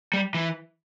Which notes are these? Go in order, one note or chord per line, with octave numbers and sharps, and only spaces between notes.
G3
E3